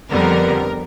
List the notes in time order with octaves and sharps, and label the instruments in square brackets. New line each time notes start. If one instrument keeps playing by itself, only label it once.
[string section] F2 D3 G3 B3 A#4